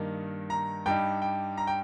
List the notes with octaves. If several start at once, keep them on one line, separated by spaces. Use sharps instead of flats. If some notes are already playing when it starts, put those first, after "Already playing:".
Already playing: G2 D#3 A#3 D#4
A#5
G2 G3 D#4 G5
G5
A#5
G5